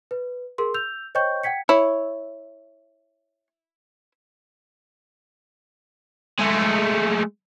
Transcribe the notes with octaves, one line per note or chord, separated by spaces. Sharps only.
B4
G#4 A#4 C6
E6 G6 F7
C5 C#5 D#5 G5 C#6 G6
F#5 G5 G#6 B6 C#7
E4 C#5
G#3 A3